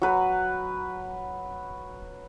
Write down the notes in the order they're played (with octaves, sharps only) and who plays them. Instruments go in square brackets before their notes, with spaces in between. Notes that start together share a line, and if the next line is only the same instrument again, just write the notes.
[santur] F#3 B4